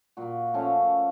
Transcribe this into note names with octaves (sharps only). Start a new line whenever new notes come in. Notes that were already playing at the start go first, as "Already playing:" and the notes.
A#2 F#4
F3 A3 C#4